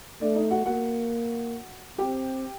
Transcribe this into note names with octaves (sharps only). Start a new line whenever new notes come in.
A3 D4 D5
D#4 D#5
F#4 F#5
A#3 F#4 F#5
C4 G4 G5